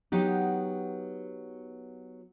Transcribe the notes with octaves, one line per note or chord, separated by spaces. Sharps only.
F#3 B3 D#4 G4